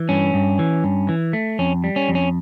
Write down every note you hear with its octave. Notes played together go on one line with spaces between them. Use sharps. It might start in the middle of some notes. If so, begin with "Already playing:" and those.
Already playing: E3
G2 C#4
G2
E3
G2
E3
A3
F2 C#4
G3
C#4
F2
C#4